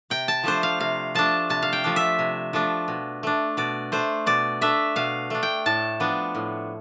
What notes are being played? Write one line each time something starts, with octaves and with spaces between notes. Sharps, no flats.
C3 G5
A5
F3 A3 D4 C5
F5
C3 F5
F3 A3 D4 A5
C3 A5
F5
G5
F3 A3 D4
E5
C3
F3 A3 D4
B2
A3 D4
B2 D5
A3 D4 C5
B2 D5
A3 D4 E5
B2 F5
A3 D4
G5
A2 A5
F3 B3 D4
A2